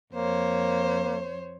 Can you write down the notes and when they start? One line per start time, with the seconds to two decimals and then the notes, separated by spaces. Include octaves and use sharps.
0.13 F2 A#3 C5 C#5